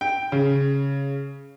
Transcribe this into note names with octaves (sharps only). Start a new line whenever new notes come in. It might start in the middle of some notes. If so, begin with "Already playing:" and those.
G5
C#3